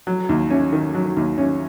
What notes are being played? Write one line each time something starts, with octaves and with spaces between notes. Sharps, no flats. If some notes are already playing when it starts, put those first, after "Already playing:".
F#3
D#2
C#4
D#3
F#3
D#2
C#4